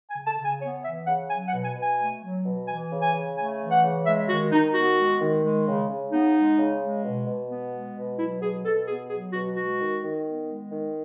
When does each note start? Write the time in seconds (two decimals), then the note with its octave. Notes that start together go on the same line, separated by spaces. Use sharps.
0.10 G#5
0.16 C#3
0.27 A5
0.38 C#3
0.45 G#5
0.62 B3 C#5
0.84 E3 E5
1.07 C#3 F#5
1.30 F#3 G#5
1.48 F#5
1.53 B2
1.65 G#5
1.76 B2
1.83 G#5
1.99 A3
2.22 F#3
2.45 B2
2.68 E3 G#5
2.92 C#3
3.02 G#5
3.14 C#3
3.37 A3 G#5
3.60 E3
3.72 F#5
3.82 C#3
4.06 G#3 E5
4.29 D#3 F#4
4.51 D#3 D#4
4.74 B3 F#4
4.98 G#3
5.21 D#3
5.44 G#3
5.67 C#3
5.90 C#3
6.12 B3 D#4
6.35 G#3
6.58 C#3
6.81 G#3
7.04 B2
7.27 B2
7.50 B3
7.73 G#3
7.96 B2
8.19 F#3 E4
8.42 B2 G#4
8.65 B2 A4
8.88 B3 G#4
9.10 F#3 G#4
9.33 B2 F#4
9.56 G#3 F#4
9.79 D#3
10.02 D#3
10.26 B3
10.48 G#3
10.71 D#3